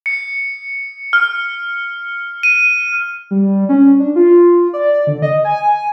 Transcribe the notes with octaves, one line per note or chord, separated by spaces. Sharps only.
C#7
F6
D#7
G3
C#4
D4
F4
D5
D3
D#5
G#5